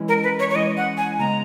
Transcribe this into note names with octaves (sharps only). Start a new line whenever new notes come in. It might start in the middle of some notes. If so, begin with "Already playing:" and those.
Already playing: E3 G#3 C#4 E4
A#4
B4
C#5
C#5
E3 G#3 C#4 E4 D#5
F#5
G#5
C#3 G#3 B3 A#5